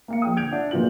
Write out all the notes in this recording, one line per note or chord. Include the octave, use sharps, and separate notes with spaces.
A#3 F5 C#7
A#1 G5 D#6
D3 G6 G#6 D7 F7
D4 E5 F#5
E1 A#2 B3 F#4 G6 F#7